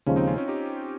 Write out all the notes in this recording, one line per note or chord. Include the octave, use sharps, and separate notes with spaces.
D#2 C#3 F3 G#3 C#4
C4 D#4
C#4 F4
C#4
D#4 G4